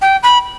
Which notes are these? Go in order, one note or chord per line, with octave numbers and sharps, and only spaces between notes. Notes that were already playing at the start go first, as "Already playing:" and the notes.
G5
B5